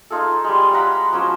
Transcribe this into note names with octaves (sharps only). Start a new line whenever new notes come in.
D#4 F4 G#4 A4
G3 G#3
F5 F#5 A#5 B5
F3 F#3 C#4 C5